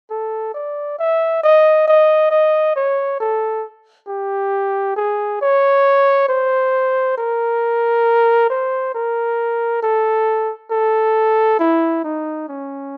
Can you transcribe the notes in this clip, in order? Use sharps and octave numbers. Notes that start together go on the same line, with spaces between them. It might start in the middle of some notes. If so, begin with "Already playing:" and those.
A4
D5
E5
D#5
D#5
D#5
C#5
A4
G4
G#4
C#5
C5
A#4
C5
A#4
A4
A4
E4
D#4
C#4